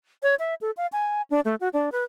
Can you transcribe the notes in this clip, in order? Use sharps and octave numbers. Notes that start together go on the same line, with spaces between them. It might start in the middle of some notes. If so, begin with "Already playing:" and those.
C#5
E5
A4
F5
G#5
D4
A3
F#4
D4
B4